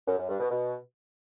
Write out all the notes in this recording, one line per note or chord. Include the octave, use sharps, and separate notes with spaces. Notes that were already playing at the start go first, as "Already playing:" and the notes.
F#2
F#2
G2
B2
B2